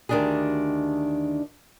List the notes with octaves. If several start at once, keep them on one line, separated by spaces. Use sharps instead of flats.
D2 D#3 B3 D4 G4 G#4